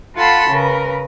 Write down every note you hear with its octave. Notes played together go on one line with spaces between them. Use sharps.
F4 A4 F#5 A5 B5 C6
C#3 A#4 B4